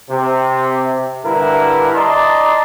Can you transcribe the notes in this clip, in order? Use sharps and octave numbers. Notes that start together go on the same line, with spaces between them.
C3
G2 D3 E4 A#4 B4
D5 D#5 A5 A#5 C6